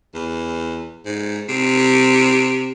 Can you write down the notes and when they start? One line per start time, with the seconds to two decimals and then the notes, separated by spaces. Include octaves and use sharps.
0.15 E2
1.05 G#2
1.49 C3